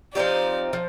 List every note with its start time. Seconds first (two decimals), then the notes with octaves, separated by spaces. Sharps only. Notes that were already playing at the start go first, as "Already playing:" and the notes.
0.15 F3 C4 D#4 G4 D5
0.73 F3